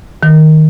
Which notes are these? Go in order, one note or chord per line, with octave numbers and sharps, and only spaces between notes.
D#3